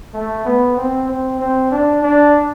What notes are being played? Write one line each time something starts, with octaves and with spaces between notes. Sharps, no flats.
A3
B3
C4
C4
C4
D4
D4